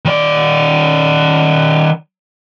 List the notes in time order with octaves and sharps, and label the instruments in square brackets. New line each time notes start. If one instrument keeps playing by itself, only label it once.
[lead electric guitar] D#3 D5